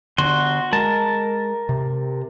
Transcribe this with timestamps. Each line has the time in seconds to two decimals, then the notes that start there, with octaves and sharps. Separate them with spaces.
0.18 D3 B3 F#4 C6
0.73 G#3 A#4 A5
1.69 C3